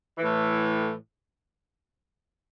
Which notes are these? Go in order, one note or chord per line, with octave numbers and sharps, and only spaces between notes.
A2 E3